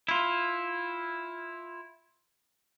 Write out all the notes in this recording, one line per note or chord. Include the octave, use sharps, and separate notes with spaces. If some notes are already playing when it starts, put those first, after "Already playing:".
E4 F4